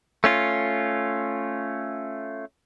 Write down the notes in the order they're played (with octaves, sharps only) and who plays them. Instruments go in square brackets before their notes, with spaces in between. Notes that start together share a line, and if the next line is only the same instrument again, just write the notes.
[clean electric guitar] A3 C#4 F4